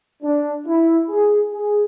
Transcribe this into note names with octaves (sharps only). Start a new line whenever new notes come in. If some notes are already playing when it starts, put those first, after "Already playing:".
D4
E4
G#4
G#4